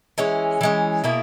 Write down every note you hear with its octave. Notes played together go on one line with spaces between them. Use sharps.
E3 G#3 C#4
E3 G#3 C#4
B2 A#3 E4 G#4